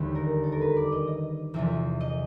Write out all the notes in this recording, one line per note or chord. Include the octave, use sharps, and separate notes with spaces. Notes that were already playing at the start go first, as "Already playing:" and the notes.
Already playing: E1 D#2 D3 G3
A#4
A4
A#4
B4
D5
D#5
D#5
E2 C3 F3 E5
D#5